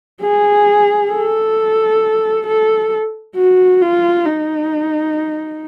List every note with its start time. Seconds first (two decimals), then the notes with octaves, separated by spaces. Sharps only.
0.22 G#4
1.11 A4
2.46 A4
3.36 F#4
3.81 F4
4.26 D#4